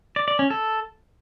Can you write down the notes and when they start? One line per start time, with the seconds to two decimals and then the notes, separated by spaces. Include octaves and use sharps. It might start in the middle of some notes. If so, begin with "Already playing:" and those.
0.16 D5
0.28 D5
0.39 C#4
0.50 A4